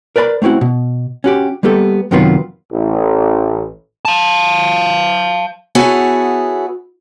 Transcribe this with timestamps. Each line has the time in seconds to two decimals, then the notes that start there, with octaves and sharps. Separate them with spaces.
0.16 A#4 B4 D5 G#5 B5
0.42 A3 C4 C#4 E4 F#4
0.61 B2
1.24 C#4 F#4 G4
1.63 G3 A#3 B3 G4 A4
2.11 F#2 C3 D#3 F#3 B3 F4
2.73 A1
4.05 F5 A5
5.75 B3 E4 F#4 G#4 A4 C#5